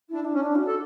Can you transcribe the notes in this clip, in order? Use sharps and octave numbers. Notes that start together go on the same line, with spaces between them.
D4 E4
D4
C#4
D4
F#4
A4